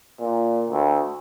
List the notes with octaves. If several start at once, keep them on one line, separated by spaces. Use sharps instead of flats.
A#2
D2